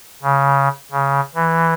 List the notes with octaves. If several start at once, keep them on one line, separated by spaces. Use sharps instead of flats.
C#3
C#3
E3